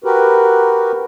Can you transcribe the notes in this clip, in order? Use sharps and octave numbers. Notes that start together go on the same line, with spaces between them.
F#4 G4 A#4 B4